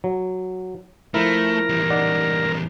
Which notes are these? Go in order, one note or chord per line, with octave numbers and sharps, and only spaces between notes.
F#3
F3 A3 E4 A#4
E2 G3
D#4 D5 F#5